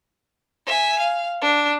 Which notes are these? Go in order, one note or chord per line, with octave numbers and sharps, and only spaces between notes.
E5 G#5
F5
D4